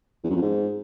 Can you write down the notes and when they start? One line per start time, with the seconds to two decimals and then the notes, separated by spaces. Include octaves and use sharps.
0.24 E2
0.30 F#2
0.36 F2
0.42 G#2